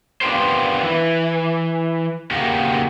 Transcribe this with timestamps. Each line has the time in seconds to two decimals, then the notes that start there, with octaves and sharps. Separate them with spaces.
0.21 B3 D4 F4 G4 A#4 C5
0.83 E3
2.31 C#3 A#3 F#4 G4 A#4